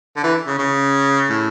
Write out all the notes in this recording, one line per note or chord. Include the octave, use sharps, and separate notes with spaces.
D3
E3
C#3
C#3
A2